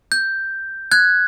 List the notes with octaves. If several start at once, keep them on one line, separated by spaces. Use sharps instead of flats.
G6
F#6 G#6